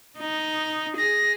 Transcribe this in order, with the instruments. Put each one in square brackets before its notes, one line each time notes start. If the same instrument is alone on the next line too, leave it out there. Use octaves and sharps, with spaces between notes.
[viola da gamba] D#4
[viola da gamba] G#4 [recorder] A#6